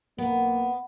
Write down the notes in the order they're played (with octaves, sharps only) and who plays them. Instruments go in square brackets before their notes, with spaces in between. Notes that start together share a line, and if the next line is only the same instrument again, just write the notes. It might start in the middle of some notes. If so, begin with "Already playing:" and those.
[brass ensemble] B1 A#3 [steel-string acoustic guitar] B3